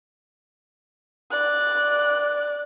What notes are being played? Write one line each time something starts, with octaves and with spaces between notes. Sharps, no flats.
D5 F#6